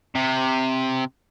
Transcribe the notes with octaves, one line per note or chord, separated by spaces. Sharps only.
C3